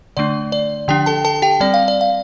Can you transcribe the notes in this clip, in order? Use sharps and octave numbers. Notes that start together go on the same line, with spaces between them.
D3 A3 D4 D5
D5
D3 F3 D4 G4 G5
A4 A5
A4 A5
G4 G5
G3 C4 D5
F5
D5
F5